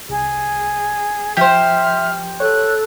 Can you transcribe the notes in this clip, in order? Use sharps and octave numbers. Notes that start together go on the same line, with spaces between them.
C2 G#4
F3 G4 C5 E5 F6 G6
A4 C#5 F#6